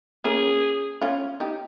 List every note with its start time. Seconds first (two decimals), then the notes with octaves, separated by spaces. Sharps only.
0.24 A#3 C#4 G#4
1.01 C#4 F4
1.40 D#4 G4